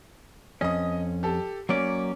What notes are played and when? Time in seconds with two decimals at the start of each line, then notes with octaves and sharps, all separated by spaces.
0.61 F2 C#4 D#5 D#6
1.23 G4 A4
1.69 F#3 A#3 C#4 D5